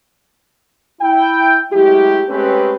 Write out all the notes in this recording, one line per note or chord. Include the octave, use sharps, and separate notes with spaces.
E4 G5
F#3 G#3 A3 E4 G4
G#3 A3 C4 C#4 G4 B4